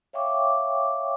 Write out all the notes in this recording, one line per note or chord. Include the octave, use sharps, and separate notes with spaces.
C#5 E5 F5 G5 C#6 D6